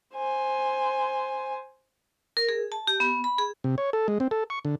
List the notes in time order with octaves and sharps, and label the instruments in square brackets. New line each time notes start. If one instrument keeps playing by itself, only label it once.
[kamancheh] C5 G#5
[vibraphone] A#4
G#4
A5
G4
B3
B5
G#4
[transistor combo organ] C3
C#5
A4
G#3
C4
A4
C#6
D3